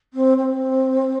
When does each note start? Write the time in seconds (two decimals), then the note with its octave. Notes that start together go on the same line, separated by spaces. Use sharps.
0.13 C4
0.37 C4